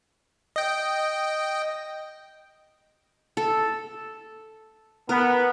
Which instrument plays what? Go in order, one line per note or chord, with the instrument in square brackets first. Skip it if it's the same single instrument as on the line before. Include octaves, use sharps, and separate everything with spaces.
[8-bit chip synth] D#5 G5
[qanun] A4
[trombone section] B3 [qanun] A#4